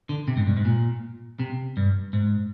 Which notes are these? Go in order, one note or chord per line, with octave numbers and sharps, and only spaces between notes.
D3
C3
G#2
G2
G#2
A#2
C3
G2
G#2